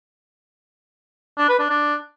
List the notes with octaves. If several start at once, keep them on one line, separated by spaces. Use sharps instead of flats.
D4
B4
D4
D4